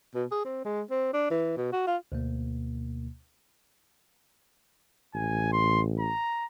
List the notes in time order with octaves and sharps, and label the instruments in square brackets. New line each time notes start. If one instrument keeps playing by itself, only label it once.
[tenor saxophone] B2
G#4
C4
G#3
C4
D4
E3
B2
F#4
F4
[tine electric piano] D2 B2 A#3
[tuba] A1 [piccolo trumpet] G#5
[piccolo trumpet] C6
A#5